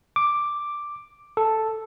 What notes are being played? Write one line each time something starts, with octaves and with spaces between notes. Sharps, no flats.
D6
A4